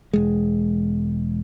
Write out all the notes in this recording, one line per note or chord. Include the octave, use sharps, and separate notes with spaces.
E1 G#3